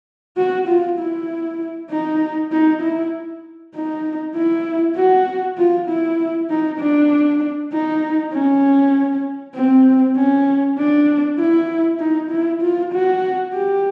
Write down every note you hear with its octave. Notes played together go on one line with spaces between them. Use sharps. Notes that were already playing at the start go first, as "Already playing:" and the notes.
F#4
F4
E4
D#4
D#4
E4
D#4
E4
F#4
F4
E4
D#4
D4
D#4
C#4
C4
C#4
D4
E4
D#4
E4
F4
F#4
G4